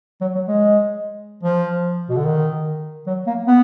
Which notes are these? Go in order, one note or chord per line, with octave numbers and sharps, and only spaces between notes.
F#3
F#3
G#3
F3
B2
D3
D#3
F#3
A#3
B3